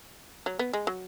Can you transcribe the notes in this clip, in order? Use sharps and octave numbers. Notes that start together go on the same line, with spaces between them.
F#3
B3
G#3
F#3